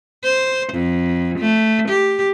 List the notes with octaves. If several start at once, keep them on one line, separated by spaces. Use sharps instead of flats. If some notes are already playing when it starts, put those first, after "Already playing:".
C5
F2
A3
G4